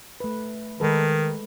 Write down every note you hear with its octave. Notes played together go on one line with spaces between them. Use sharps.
A3 B4
D#3 G#3 A4 B4